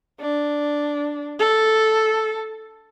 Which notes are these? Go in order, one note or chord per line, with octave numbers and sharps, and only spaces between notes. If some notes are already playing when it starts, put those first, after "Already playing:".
D4
A4